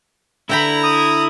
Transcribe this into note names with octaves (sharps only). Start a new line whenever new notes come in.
D3 E4 G5 A#5 B5
D#6